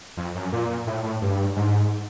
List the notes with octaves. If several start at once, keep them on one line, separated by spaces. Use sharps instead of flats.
F2
F#2
A#2
A2
A2
G2
G#2